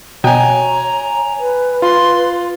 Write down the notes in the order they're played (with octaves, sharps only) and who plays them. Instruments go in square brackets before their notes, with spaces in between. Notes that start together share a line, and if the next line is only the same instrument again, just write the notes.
[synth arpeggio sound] B2 [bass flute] C#5 [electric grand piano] G5 G#5 [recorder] A#5
[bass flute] B4
[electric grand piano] F4 [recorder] C6